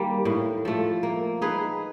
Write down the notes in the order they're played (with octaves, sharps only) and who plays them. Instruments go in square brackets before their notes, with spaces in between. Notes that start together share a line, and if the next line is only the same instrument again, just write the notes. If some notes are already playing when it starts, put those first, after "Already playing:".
Already playing: [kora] D#3 G3 A#3
A2
F3 A3
A#3
D#4 G#4 B4